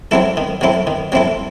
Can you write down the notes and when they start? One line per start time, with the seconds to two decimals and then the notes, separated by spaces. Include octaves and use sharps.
0.11 F#3 C4 E4 A4
0.37 D#3
0.61 F#3 C4 E4 A4
0.87 D#3
1.12 F#3 C4 E4 A4